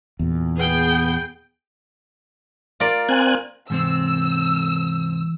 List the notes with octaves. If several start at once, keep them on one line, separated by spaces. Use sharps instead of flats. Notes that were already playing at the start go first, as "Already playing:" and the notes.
E2 A#2
B3 G#4 G5
F4 A#4 D5
C4 G#5 F#6
G#2 C3 E3 C4 E6